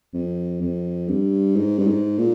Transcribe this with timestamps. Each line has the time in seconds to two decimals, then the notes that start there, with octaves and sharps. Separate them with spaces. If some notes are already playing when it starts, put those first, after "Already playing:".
0.13 F2
0.61 F2
1.08 G2
1.56 G#2
1.79 G2
1.87 G#2
2.19 A#2